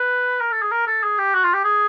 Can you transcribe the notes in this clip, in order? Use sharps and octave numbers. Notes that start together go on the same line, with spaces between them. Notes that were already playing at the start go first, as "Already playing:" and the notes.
Already playing: B4
A#4
A4
G#4
A#4
A4
G#4
G4
F#4
F4
G4
G#4